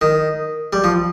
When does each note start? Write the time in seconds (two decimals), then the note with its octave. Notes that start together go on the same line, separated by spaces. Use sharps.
0.01 D#3
0.73 G3
0.84 F3